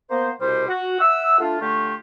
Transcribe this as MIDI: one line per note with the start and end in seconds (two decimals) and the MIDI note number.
0.11 0.30 58
0.11 0.30 59
0.11 0.30 72
0.40 0.65 36
0.40 0.65 47
0.40 0.65 55
0.40 0.65 72
0.68 0.99 66
1.00 1.40 76
1.00 1.40 78
1.00 1.40 88
1.40 1.58 57
1.40 1.58 62
1.40 1.58 65
1.61 1.94 50
1.61 1.94 57
1.61 1.94 65
1.61 1.94 67
1.61 1.94 85